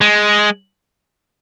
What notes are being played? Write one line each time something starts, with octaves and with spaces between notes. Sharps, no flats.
G#3